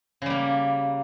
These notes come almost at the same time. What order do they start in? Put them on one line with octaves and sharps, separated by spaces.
C#3 G3 A#3